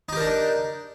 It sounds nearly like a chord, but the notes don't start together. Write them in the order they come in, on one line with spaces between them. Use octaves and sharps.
D#4 G4 A#4 D4